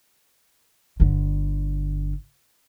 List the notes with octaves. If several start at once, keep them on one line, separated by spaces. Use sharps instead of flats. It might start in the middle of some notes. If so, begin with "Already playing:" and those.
G1 D3